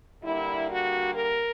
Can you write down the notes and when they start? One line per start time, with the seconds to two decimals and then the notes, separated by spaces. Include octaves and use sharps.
0.24 D3 G3 A#3 E4
0.70 F#4
1.16 A#4